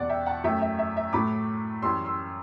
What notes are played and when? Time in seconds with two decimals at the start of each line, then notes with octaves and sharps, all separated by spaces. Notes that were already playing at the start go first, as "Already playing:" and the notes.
Already playing: E2 B2 G3 D5 F#5
0.09 E5 G5
0.26 F#5 A5
0.44 F#2 F#3 A3 E5 G5
0.62 E5
0.79 E5
0.97 E5
1.13 A2 F#3 A3 B5 D6
1.82 F#2 E3 G3 C6 E6
2.05 C6 E6